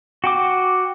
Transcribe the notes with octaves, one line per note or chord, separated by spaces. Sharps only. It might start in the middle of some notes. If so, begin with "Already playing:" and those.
F#4 G5 D6